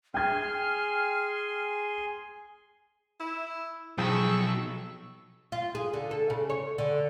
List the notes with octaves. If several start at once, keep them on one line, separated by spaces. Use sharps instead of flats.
G#4 G5 G#5 C6 F6 G#6
E4
B1 F3 G#4 G5 C#6 E6
F4
G#4
D3
A4
C#3
C#5
D3